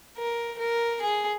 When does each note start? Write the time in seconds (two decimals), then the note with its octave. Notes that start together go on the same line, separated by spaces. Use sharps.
0.17 A#4
0.59 A#4
1.01 G#4